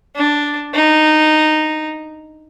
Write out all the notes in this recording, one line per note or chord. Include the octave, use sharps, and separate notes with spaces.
D4
D#4